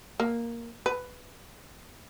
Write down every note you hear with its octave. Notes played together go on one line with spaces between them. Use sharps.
A#3
B4